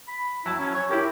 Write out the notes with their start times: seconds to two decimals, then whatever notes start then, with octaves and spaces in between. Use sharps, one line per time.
0.08 B5
0.46 F#3 E4 A5
0.59 C#4
0.74 C#5
0.90 E4 G4 A#4